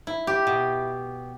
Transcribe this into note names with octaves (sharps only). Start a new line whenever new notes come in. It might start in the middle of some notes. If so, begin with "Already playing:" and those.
E4
G4
B2